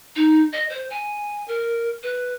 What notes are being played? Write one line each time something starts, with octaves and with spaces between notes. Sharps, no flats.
D#4
D#5
C5
G#5
A#4
B4